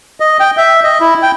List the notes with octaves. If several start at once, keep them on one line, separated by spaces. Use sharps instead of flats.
D#5
G5
E5
D#5
E4
G5